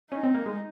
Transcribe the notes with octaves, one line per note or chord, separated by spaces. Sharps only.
C#4 D#4
C4
A#3
G#3